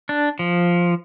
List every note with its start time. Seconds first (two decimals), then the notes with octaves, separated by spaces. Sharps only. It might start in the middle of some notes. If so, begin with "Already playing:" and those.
0.09 D4
0.39 F3